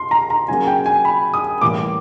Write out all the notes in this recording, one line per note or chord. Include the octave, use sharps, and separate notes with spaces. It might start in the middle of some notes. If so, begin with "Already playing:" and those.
Already playing: C6
A#5
A#5
C#3 F#3 A#3 G#5
G5
G#5
B5
D#6
A2 E3 G3 A#3 D6